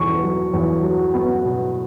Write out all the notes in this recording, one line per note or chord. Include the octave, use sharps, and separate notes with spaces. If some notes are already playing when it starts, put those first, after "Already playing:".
Already playing: E2 B2 B3 C#6
F#3
E2
F#3
B3
B2